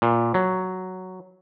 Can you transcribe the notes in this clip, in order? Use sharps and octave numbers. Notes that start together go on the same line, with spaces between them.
A#2
F#3